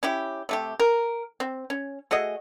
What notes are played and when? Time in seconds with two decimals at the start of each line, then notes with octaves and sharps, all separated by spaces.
0.03 C#4 E4 G4
0.49 C3 A3 G4
0.80 A#4
1.40 C4
1.70 C#4
2.11 A3 F#4 G#4 D#5